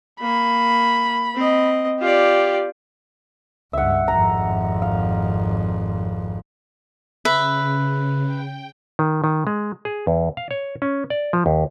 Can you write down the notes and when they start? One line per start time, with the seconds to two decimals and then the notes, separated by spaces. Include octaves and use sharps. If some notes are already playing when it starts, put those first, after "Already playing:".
0.21 A#3 B5
1.35 C4 D#5
2.01 F4 G4 D5
3.73 C#2 G2 E5 F#5
4.08 G#1 F2 A#5
4.82 F5
7.25 C#3 B4 E5
8.25 G5
8.99 D#3
9.24 D#3
9.47 G#3
9.85 G#4
10.07 E2
10.37 F5
10.51 C#5
10.82 C#4
11.10 D5
11.33 F3
11.46 D#2